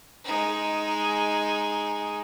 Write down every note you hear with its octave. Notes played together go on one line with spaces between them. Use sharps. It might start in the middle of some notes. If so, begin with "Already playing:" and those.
G#3 D#4